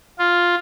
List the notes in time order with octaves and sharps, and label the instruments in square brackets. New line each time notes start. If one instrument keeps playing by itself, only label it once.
[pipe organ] F4